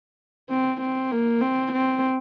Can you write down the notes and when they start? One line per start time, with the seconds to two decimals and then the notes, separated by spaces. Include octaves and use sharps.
0.50 C4
0.81 C4
1.11 A#3
1.41 C4
1.72 C4